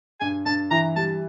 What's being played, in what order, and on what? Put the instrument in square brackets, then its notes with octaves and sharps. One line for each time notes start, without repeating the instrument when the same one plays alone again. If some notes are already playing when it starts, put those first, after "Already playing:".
[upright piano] G2 [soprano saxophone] G#5
[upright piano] G2 [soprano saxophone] A5
[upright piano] E3 [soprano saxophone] A#5
[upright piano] G3 [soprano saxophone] A5